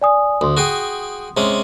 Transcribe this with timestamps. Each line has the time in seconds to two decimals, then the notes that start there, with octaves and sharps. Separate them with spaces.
0.01 D5 G#5 D#6
0.41 D2 C6 D#6
0.57 F#4 G#4 G5
1.37 C3 G#3 C#4